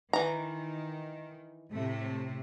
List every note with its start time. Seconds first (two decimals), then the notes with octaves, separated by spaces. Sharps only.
0.13 D#3 E3 A#5
1.71 A2 C3 A3